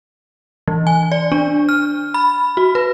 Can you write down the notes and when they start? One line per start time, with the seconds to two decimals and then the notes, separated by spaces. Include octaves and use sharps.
0.68 E3
0.87 G#5
1.12 D5
1.32 D4
1.69 F6
2.14 B5
2.57 F#4
2.75 B4